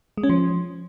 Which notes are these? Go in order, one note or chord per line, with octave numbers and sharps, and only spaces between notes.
G#3
C#4
F3